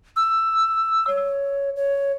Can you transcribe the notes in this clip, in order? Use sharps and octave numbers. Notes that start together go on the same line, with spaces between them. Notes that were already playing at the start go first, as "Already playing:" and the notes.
E6
C#5
C#5